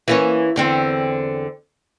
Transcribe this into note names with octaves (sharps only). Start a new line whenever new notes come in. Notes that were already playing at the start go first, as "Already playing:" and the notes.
E3 A#3 C#4
E2 D3 C4